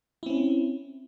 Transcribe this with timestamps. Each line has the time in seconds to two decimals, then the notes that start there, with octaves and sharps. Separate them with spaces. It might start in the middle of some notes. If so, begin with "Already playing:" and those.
0.23 E4
0.26 C4
0.30 C#4